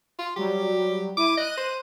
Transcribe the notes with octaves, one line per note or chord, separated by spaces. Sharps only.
F4
F#3 G3 G4
E4 D6 D#7
D#5 F#6 D#7
C5